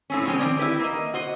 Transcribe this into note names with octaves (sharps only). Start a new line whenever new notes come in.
A2 C4 C#4
B2 F3 G#3 C4 C#4
D#3 E3 C4 D5
E4 G4 B4
A#3 D#5
F#4 C5 D#5